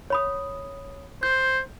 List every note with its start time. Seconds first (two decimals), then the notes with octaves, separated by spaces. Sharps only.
0.10 C#5 B5 D#6
1.23 C5 G6